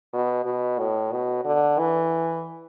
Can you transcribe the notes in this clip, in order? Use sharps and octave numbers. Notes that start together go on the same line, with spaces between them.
B2
B2
A2
B2
D3
E3